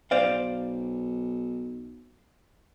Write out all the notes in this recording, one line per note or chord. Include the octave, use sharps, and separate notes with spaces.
B1 C5 D5 F5